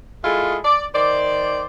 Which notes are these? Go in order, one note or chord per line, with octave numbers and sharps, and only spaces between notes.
G#3 E4 F4 G#4 A4
D5
D#3 C5 D5